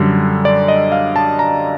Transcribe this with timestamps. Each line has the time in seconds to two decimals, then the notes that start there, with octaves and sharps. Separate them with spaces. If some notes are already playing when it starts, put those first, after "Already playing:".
Already playing: F#2 D3 G3
0.45 D5
0.68 D#5
0.92 F5
1.16 A5
1.39 A#5